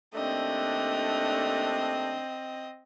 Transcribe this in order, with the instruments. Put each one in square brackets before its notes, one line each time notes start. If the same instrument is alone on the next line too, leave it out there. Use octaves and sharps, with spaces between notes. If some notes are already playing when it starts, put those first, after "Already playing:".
[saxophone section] D#2 A3 D4 [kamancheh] C4 D#5